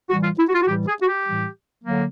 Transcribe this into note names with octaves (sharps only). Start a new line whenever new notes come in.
A2 E3 G3 F#4
F4
E4
F#4
F4
F#4
A2 E3 G3 G4
G#4
F#4
G4
A2 E3 G3
D3 F#3 A#3